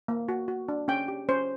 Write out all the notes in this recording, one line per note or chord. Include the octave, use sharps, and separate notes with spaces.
A#3
F#4
F#4
D4
C#4 G5
G4
C#4 C5